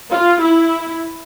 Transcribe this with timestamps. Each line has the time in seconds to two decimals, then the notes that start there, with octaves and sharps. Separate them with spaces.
0.11 F4
0.41 E4